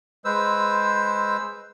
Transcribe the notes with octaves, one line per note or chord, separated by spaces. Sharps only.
G#3 B4 C5 E6